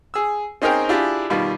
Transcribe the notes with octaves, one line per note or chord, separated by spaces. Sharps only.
G#4 E6
C4 C#4 D#4 G#4 A#4 G5
D4 E4 F4 G4 G#4
B2 D#3 G3 F4